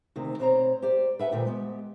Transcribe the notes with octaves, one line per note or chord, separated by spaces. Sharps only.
D2 C3 D#3
B2 C4 D#4 C5 C#5 A#5
G4 C5 D5
B4 E5 F#5 G5 A5
D2 A#2 F4 G5
G#3 B3 G4